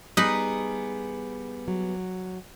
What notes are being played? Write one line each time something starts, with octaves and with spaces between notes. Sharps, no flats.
G3 B3 D#4 G#4 B4
F#3